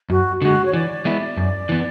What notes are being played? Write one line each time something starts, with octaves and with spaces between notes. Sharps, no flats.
F#2 F#4
D3 G#3 F#4
C#5
E3 D5
G#3 B3 E4
F#2
E3 B3